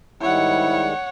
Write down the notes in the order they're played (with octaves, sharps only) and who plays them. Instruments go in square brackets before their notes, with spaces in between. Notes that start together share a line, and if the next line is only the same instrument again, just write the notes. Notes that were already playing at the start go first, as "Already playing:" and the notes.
[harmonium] G#2 D#3 G3 [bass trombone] E4 [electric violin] C#5 F#5